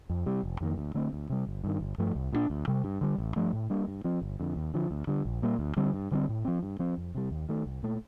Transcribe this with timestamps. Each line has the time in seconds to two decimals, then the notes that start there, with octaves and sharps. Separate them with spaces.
0.10 F2
0.26 C3 G3
0.43 F1
0.61 F2 D#3 A#3
0.78 D2
0.94 D3 A3 C4
1.13 D2
1.30 C3 G3
1.47 G1
1.64 G2 D#3
1.81 G1
1.98 G2 F3 A3
2.15 C2
2.33 A#2 G3 D4
2.50 D2
2.68 C3 G3
2.84 G2
3.01 D3 G3
3.18 A1
3.36 G2 F3 A3
3.53 A2
3.70 G3 A#3 D4
3.88 G2
4.04 F3 C4
4.21 G1
4.40 F2 D3
4.56 D#2
4.74 D3 F3
4.91 D2
5.07 D3 G3
5.25 A#1
5.42 A#2 G3 A#3
5.59 D2
5.77 D3 G3 C4
5.93 G2
6.11 D3 G3 C4
6.29 A2
6.45 F3 C4
6.63 G2
6.79 F3 C4
6.97 F2
7.15 C3 G3
7.31 D#2
7.49 D#3 A3
7.66 C2
7.83 A#2 A3